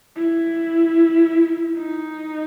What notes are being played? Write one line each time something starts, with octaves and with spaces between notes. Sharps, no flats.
E4
D#4